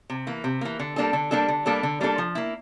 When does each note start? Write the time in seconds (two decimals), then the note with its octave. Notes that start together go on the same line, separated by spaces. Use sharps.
0.10 C3
0.27 E3 A#3
0.44 C3
0.61 E3 A#3
0.79 D3
0.96 G3 A#3 D4 A4
1.13 D3
1.31 G3 A#3 D4 A4
1.48 D3
1.66 G3 A#3 D4 A4
1.83 D3
2.01 G3 A#3 D4 A4
2.18 F3
2.35 A#3 E4